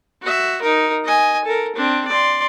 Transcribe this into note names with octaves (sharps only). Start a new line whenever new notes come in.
F#4 E5
D#4 A#4
D#5 G#5
A4 A#4
C4 D4
D5 C6